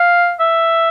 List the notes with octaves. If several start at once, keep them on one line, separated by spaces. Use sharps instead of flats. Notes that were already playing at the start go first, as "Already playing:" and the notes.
Already playing: F5
E5